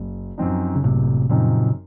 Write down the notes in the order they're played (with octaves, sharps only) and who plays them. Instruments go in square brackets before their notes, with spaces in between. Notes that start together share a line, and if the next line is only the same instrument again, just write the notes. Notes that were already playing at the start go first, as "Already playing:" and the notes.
Already playing: [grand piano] F#1
F#2 F3 C4 D#4
[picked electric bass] C#3
[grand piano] F#1 [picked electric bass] A2 C3
[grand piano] F#2 F3 C4 D#4 [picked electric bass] A#2 C#3